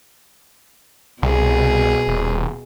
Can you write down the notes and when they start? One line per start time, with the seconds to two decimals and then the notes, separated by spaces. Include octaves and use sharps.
1.22 C2 B2 G#4
2.07 D#1